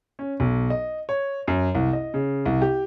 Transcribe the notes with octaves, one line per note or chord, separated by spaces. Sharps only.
C#4
B1
D#5
C#5
F#2
C2
D#5
C#3
C2
G4